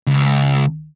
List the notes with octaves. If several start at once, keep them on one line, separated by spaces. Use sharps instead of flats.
C#2